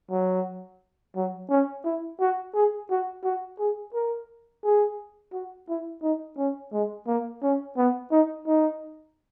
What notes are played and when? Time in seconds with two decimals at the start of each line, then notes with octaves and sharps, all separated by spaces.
0.11 F#3
1.16 F#3
1.50 C#4
1.85 E4
2.20 F#4
2.55 G#4
2.90 F#4
3.24 F#4
3.59 G#4
3.94 A#4
4.64 G#4
5.33 F#4
5.69 E4
6.03 D#4
6.38 C#4
6.73 G#3
7.07 A#3
7.43 C#4
7.77 B3
8.12 D#4
8.47 D#4